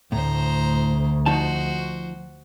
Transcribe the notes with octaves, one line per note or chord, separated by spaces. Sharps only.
D2 A2 C5 A#5
F3 D#4 F#4 C5 A5